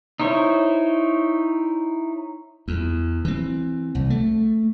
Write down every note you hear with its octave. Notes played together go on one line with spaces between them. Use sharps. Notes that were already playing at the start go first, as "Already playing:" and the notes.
D#4 E4 C5 C#5
E2
E3 C4
C2
A3